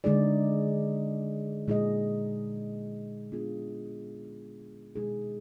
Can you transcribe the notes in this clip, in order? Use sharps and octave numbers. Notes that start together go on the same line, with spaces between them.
D3 G#3 D#4 G#4 D5
A#2 G#3 D#4 G#4 D#5
B3 D4 F4 G#4
B2 G#3 D#4 G#4